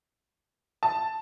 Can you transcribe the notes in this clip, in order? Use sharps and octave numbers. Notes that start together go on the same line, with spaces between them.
A5